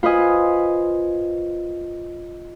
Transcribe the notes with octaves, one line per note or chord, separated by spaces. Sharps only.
F4 B4 C5 D#5 G#5